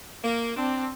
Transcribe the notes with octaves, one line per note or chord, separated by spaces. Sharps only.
A#3
C4 D4